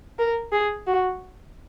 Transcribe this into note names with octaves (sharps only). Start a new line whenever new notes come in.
A#4
G#4
F#4